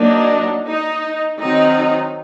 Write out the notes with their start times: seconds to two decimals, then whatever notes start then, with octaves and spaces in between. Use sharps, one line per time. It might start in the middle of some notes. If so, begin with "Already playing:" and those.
Already playing: F#3 A#3 D4 D#4
0.65 D#4
1.38 D#3 F#3 C4 D#4